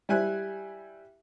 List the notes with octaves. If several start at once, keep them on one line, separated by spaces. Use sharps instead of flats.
G3 E4 G#5 F#6